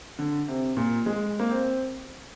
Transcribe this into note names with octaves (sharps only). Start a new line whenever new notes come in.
D3
C3
A#2
G#3
A#3
C4